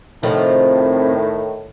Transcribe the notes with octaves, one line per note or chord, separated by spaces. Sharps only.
A2 C3 D#3 F3